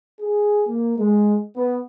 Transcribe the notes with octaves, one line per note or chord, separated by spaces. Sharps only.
G#4
A#3
G#3
B3